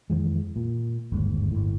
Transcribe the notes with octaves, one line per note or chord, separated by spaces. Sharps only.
F2 D#3 E3 G#3
A#2
G1 D#2 G#2
G1 A2